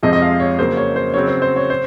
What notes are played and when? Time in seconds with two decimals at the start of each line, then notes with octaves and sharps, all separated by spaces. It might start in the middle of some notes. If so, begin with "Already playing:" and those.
0.03 F2 C3 F3 G#3 D#5
0.13 D#5
0.22 F5
0.40 C#5
0.59 C#3 F#3 A#3 C5
0.77 C#5
0.96 C5
1.14 C#3 F#3 C4 C#5
1.28 C5
1.42 C5
1.56 C#5
1.70 C5